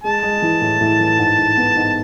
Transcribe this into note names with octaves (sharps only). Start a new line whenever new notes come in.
G#3 A5
G#3
E3
A2
A2
E3
G#2
G#2
B3
G#2